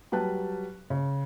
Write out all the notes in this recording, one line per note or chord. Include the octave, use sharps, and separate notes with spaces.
F#3 G3 B4 A5 F#6
C#3